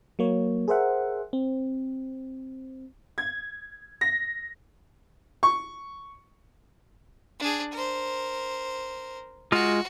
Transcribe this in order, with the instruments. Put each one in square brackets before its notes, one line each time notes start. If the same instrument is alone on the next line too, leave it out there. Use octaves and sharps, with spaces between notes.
[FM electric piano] F#3 A#3 C#5
G#4 A#4 C5 E5 F#5
C4
[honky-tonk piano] G#6
A#6
[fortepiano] C#6
[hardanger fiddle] D4 G#4
A#4 C5
[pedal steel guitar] G#3 F4 F6 [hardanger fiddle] F#4